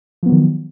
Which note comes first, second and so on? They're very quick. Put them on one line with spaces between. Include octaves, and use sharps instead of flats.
F3 B3 F#3 D#3